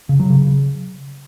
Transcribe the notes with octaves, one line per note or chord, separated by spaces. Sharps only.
C#3
F#3
C#3